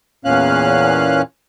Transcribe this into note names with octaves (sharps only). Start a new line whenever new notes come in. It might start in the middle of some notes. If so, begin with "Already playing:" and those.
E2 A#2 C#4 F5 F#6